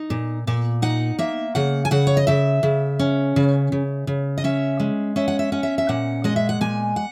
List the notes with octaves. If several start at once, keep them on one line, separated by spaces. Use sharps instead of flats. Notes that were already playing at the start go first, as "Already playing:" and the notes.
Already playing: D#4
A#2
A#2
D#4 F#5
A#3 E5
C#3 F#5
G#5
C#3 F#5
C#5
D#5
C#3 E5
C#3
C#4
C#3
C#3
C#3
D#5
C#4 E5
G#3
C#4 E5
F#5
E5
C#4 F#5
E5
E5
A#2 F#5
G#3 D#5
E5
F#5
A#2 G#5
F#5